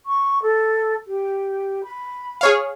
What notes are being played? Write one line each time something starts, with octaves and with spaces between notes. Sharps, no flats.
C#6
A4
G4
B5
G#4 C#5 F5